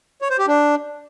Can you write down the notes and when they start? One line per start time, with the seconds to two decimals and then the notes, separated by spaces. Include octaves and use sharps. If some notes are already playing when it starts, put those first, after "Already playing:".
0.22 C#5
0.30 C5
0.39 G4
0.47 D4